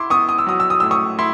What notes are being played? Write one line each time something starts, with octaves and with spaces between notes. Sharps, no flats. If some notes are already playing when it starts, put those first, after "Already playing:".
Already playing: E4 C6 D6
B3 C#6 D#6
D#6
E6
F#3 D#6
E6
D#6
A2 E6
C#6 D#6
E4 C6